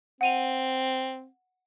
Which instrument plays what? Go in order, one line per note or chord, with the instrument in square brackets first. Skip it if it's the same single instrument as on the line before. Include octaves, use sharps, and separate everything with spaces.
[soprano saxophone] C4 [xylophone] F#5 D#7 F7